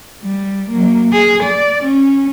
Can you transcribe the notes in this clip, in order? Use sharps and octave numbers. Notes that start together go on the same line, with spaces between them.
G3
F#3 A#3
G#4
D5
C#4